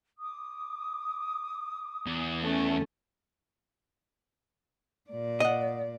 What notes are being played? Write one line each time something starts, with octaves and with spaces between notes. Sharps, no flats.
D6 D#6
E2
A3 C#4
A#2 D5
D#5 F#5